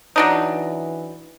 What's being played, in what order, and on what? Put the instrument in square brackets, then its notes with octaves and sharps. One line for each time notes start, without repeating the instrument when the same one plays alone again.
[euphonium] E3 [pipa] F#3 D4 D#4